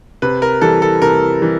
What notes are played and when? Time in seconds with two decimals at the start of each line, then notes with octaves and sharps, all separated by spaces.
0.22 C3 B4
0.42 A#4
0.61 E3 G3 A4
0.82 A4
1.02 C3 A#4
1.41 E3 G3